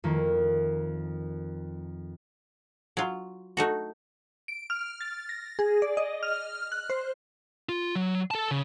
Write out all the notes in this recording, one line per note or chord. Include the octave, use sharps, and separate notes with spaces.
F2 D#3 A3 A#3
F#3 F4
A3 D#4 F#4
D7
F6
A6
A#6
G#4
D5
D#5
F6
F#6
C5
F4
F#3
A4 A5
C#3